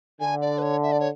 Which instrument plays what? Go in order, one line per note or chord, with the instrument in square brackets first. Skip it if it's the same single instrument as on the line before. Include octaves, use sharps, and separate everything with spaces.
[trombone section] D3 [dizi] G#5
[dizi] D5
B4
C#5
E5
D5
C#5